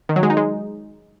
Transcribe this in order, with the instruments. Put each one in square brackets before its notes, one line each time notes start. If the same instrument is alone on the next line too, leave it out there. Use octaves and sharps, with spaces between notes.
[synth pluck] D#3
F#3
G#3
D#4
G#3